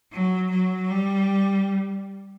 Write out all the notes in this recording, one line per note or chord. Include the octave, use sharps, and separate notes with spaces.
F#3
F#3
G3